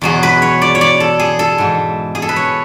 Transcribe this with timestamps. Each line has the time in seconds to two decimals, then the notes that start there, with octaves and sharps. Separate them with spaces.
0.01 E2 B2 F#3 G#4
0.23 B4
0.42 C#5
0.61 D5
0.75 C#5
0.81 D5
1.00 A4
1.20 G#4
1.39 A4
1.58 G#2 E3
2.15 G#4
2.22 A4
2.29 B4
2.36 C#5